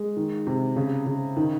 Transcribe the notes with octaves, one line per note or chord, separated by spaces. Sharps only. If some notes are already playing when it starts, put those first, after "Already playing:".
Already playing: G#3
D#3
C3
C#3
C#3
D#3